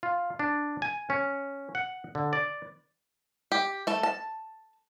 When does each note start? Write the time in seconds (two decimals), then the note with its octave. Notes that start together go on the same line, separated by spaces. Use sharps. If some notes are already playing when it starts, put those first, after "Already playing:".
0.03 F4
0.39 D4
0.82 G#5
1.10 C#4
1.75 F#5
2.15 D3
2.33 D5
3.52 G4
3.87 A3 A5
4.03 A5